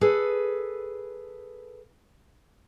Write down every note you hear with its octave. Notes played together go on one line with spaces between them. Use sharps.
G#4 A4 B4